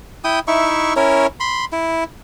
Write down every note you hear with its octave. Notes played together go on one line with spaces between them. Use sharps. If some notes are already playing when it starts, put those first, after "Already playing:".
E4 G5 D#6
D#4 E4 E5 C#6
C#4 E4 A#4 C#5
B5 C6
E4